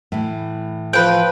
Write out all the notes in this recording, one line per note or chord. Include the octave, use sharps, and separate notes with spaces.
A2 E3
F3 B4 G5